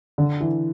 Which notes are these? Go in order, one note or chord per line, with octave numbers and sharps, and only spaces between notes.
D3
E3